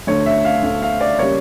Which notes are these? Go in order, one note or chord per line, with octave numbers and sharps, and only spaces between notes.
D2 D3 A3 C#5
E5
F5
D2 D3 A3 F5
F5
D5
C#3 G3 A#3 C#5